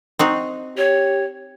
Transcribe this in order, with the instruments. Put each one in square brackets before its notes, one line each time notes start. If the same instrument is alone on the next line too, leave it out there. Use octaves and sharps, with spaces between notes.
[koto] C4 D#4 F#4
[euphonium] G4 [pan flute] C#5